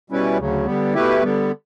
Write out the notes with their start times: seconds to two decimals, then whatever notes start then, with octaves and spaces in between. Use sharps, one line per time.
0.10 B2 G3 C#4 E4 B4
0.38 D2 C#3 F#3
0.66 D3 G3 B3
0.94 B2 A3 E4 G4 B4
1.23 D3 G3 B3